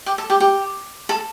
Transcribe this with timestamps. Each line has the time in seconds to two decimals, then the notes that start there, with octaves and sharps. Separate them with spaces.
0.06 G4
0.18 A4
0.30 G4
0.40 G4
1.09 A4